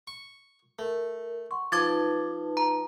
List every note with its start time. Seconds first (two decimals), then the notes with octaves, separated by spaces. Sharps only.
0.07 C#6
0.79 A3 A#4
1.51 F#5 C6 C#6
1.72 F3 D#4 B4 A5 D6 G#6 A6
2.57 A#5